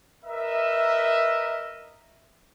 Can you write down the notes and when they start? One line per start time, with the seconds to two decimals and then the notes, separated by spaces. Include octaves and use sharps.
0.25 A#4 B4 D#5 E5